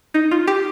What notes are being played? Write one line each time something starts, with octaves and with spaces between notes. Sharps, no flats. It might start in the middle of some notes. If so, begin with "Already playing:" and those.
D#4
F4
G4